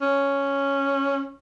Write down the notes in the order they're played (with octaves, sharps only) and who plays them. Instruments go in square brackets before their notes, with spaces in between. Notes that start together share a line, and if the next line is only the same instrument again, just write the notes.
[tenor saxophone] C#4